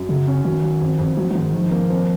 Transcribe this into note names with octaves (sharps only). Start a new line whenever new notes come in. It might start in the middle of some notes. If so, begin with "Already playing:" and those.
Already playing: F#2
C#3 F#3
C#4
D#3 F#3
F#3
F2
F2
F3 F#3
F3
G#2 D#3
D#3 F3
A#3
C4